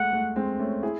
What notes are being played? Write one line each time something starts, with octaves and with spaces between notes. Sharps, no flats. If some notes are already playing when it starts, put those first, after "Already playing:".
Already playing: G#3 A3 F#5
A3
G#3 C4
A3 C#4
E4 G#4